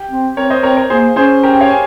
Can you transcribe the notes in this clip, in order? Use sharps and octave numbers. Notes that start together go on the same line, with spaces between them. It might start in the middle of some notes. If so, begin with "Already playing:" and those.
Already playing: G4
C4
C4 A#4 C#5
C5 D#5
C4 A#4 C#5
A#4 C#5
A#3 G#4 C5
C#4 G#4 C5
G4 A#4
G5
C#5 F5
G#5